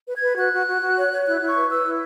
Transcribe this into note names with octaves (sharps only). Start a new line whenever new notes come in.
B4
G#6
B4
F#4 F#6
F#4
F#4
F#4
C#5
C#5
E4 F#6
E4
C#6
B4
B4 E6
E4